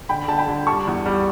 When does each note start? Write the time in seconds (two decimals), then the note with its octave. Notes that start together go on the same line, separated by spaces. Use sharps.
0.09 D3 G5 B5
0.28 D3 A5
0.38 G5 B5
0.48 D3
0.67 G3 A5 C#6
0.87 E2
1.06 G3